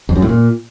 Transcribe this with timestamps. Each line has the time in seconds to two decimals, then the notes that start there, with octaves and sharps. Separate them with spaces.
0.09 F2
0.16 F#2
0.22 A2
0.29 A#2